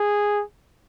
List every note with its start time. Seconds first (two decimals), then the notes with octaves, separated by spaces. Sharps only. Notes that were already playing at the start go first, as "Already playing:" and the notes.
Already playing: G#4